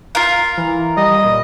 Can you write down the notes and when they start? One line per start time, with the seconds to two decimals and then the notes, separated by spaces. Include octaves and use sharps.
0.15 F4 A#4 F5
0.57 E3
0.97 G3 D#5
1.24 A#2